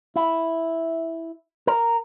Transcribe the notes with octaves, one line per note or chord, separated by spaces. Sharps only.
E4
A#4